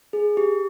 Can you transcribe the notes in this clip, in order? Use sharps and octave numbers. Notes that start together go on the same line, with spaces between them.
G#4
G4